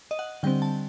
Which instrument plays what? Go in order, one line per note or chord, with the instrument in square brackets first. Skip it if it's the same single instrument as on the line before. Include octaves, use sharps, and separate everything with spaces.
[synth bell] D#5
F#5
D3 G3 C4 G5
A5